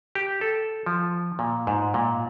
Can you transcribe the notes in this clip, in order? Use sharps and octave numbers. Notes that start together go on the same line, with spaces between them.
G4
A4
F3
A#2
G#2
A#2